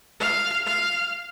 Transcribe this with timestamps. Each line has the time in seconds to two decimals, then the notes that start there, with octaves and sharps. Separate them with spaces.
0.20 F5
0.66 F5